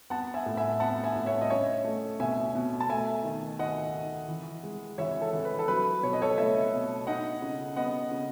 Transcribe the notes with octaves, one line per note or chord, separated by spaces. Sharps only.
B3 F#5 A5
E5 G#5
A2
E5 G#5
B3 F#5 A5
E5 G#5
A2
C#5 E5
D#5
C#4 C#5 E5
A3
B2 E5 G#5
B2
A5
A3 E5 G#5
D#3
D#3 D#5 F#5
D#3
E3
G#3
E3 C#5 E5
A4
E3
B4
A4
F#3 B4
B2 C#5
D#5
A4 C#5
A3 C#5 E5
B2
D#4 D#5 F#5
C#3
B3 D#5 F#5
C#3